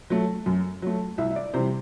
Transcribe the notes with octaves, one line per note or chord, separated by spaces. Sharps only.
F#3 A3
F#2
F#3 A3
C2 E5
E5
D5
C3 E3 G3 C5